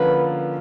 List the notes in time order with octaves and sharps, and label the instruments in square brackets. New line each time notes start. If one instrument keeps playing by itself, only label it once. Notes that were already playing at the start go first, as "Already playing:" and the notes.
Already playing: [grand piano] D3 F3 A#3 C#4 F4 [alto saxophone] B4